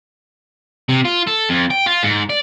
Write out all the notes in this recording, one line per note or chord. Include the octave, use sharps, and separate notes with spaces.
C3
F4
A4
F2
G5
F4
G#2
D5